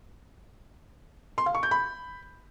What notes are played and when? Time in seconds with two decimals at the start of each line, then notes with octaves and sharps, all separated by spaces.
1.38 C6
1.46 F5
1.55 C#6
1.63 G6
1.71 B5